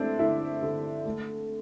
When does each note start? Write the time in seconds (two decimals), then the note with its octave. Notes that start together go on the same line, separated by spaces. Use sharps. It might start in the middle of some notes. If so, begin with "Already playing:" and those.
Already playing: A3 C4 D4 E4
0.19 D3 E4
0.62 D3
1.06 A3